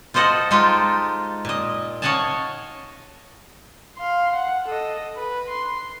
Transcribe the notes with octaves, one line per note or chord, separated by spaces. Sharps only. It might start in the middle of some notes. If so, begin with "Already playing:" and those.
F4 A4 C5 D#5 F#5
G#3 D#4 F4 G4 A4
A#2 D#5
C#5 D#5 F5 F#5 G#5 A5
F5 C6
F#5
A4 D#5
B4
C6